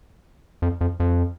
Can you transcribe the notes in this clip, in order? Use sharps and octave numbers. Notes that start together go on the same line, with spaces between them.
F2
F2
F2